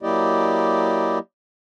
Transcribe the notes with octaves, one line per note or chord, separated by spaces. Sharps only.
F#3 A#3 E4 G4 D5 D#5